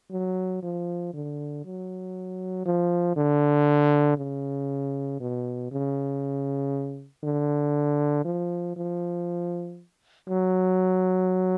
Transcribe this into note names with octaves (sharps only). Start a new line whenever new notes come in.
F#3
F3
D3
F#3
F3
D3
C#3
B2
C#3
D3
F3
F3
F#3